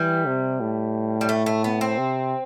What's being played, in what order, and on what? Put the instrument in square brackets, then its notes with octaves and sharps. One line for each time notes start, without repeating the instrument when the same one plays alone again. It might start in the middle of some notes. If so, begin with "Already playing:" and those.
Already playing: [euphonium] E3 [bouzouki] G3
[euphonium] C3
A2
[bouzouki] G3
A3
A3
B3
C4
[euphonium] C3